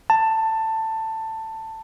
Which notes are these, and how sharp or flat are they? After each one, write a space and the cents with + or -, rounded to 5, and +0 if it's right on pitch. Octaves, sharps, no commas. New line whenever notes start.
A5 +15